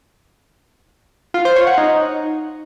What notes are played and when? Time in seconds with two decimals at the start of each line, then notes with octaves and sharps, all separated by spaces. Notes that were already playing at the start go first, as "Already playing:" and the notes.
1.34 F4
1.45 C5
1.56 C#5
1.67 F#5
1.78 D#4